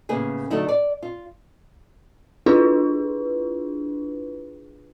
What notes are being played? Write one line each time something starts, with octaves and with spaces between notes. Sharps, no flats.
A2 C#3 A#3 B3 G#4
D3 F#3 A3 D#4 E4
D5
F4
D4 E4 F4 G#4 B4